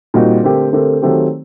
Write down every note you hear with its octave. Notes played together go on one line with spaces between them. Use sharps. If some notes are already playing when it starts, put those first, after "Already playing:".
A#2 G3 C4 D#4 F#4
D3 A3 C4 G4 A#4
D3 A3 C4 G4 A#4
D#3 F#3 A3 C4 G4